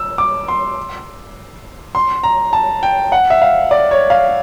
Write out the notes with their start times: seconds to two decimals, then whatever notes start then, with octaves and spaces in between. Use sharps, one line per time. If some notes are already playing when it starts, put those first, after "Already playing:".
Already playing: E6
0.18 D6
0.48 C6
1.95 C6
2.23 A#5
2.53 A5
2.83 G5
3.12 F#5
3.30 E5
3.42 F5
3.71 D5
3.91 C#5
4.10 F5